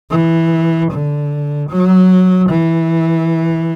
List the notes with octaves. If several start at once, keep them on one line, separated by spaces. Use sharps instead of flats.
E3
D3
F#3
E3